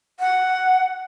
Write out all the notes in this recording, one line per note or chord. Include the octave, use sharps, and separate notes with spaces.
F#5